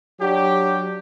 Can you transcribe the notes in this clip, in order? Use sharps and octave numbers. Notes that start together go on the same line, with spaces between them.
F#3 D4 G4